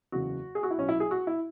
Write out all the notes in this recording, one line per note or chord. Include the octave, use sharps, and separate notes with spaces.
F#1 E2 C#3 F#4
G#4
F#4
E4
B1 B2 C#4
E4
G#4
F#4
E4